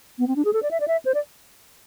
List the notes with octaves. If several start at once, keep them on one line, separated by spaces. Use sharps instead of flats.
B3
C4
D4
G#4
A4
D5
E5
D5
E5
C5
D5